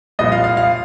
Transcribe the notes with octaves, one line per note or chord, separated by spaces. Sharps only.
C2 A#2 F3 D#5
F5
F5
F5